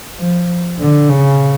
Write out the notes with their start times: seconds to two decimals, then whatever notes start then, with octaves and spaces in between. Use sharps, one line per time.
0.19 F3
0.79 D3
1.09 C#3